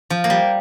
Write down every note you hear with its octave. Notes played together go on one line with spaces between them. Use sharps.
F3
A#3
G3